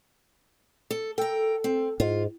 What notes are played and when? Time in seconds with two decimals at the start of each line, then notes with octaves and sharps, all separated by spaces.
0.91 A4
1.18 A4 A#4 G5
1.64 C4
2.00 G#2 F4